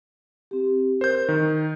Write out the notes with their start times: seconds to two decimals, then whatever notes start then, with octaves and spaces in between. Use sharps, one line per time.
0.51 C4 G4
1.01 A#4 C5 G6
1.29 D#3